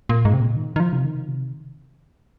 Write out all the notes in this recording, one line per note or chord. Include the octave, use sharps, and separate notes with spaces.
A#2
G#2
C3
A#2
D#3
D#3
F3
C3
D#3
C3